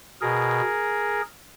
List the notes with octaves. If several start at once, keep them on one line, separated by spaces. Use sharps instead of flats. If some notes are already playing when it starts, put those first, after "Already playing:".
B2 G#4 A#4